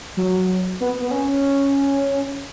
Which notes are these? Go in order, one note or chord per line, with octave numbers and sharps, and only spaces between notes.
F#3
B3
B3
C#4